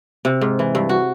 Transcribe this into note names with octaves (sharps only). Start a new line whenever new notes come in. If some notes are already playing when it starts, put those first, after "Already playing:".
C3
G#2
E3
G2
F#4